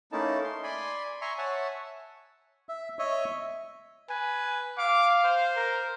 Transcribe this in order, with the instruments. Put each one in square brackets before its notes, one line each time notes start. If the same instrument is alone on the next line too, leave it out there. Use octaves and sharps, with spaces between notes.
[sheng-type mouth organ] A3 A#3 C#4 D#4 E4 A5
C6
D5 G#5 B5 C6
E5 G#5 A#5 C6 C#6
C#5 E5 F#5 G#5 A5
[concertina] E5
C#5 D#5 E5
[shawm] B4 [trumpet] G#5
[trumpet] F5 [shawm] D6
[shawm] C5
[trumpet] A#4